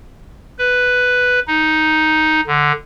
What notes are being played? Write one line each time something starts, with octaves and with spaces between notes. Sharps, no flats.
B4
D#4
D3